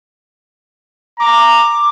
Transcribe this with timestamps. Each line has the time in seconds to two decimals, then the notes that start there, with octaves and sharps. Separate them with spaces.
1.20 A#5 D6